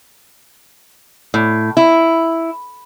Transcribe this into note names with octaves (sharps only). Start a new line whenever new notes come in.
A2
E4